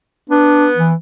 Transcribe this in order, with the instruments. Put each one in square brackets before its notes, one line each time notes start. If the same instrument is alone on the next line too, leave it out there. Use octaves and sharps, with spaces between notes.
[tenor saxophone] B3 [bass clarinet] D4
[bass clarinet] E3